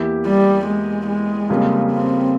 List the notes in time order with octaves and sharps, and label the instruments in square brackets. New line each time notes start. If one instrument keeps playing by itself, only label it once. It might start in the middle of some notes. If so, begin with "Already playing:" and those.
Already playing: [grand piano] E2 E3 A#3 E4 G4
[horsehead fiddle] G3
G#3
G#3
[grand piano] F2 C#3 G3 A#3 F4
[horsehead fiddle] C4